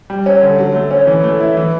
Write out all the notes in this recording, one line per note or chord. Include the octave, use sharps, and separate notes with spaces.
G3
C#4
D3
F#3
A3
C#4
E3
A3
E4
E3